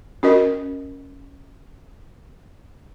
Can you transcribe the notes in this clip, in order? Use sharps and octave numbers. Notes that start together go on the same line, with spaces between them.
C#4 F#4 A#4 D#5